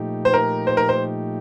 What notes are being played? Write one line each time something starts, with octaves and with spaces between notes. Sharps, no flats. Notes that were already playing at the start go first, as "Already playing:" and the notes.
Already playing: A#2 F3 A3 D#4 G4
C5
A#4
C5
A#4
C5